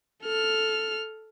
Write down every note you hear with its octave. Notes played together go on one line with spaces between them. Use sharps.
A4 F6